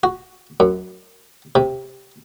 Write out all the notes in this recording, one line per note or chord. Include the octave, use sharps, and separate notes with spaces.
F#4
F#2
C3